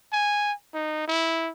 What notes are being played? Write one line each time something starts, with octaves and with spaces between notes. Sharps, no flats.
G#5
D#4
E4